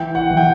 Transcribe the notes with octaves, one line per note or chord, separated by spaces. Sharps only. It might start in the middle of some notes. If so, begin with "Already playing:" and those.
Already playing: E3 G5
F#5
E3
G5